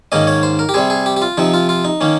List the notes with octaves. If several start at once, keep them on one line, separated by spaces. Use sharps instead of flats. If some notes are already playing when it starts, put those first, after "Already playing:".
G#2 D#3 A#3 C#4 D#5
C#5
C5
A#4
G4
C3 G3 C4 G#4
G#4
G4
G4
F4
C3 F3 C4 D#4
F4
F4
D#4
D#3 A#3 C#4